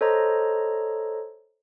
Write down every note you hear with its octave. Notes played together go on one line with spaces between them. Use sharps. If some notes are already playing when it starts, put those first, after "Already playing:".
A4 C5 C#5 D#5 A#5